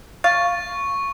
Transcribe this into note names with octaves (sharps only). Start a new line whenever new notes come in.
F5 C#6 A6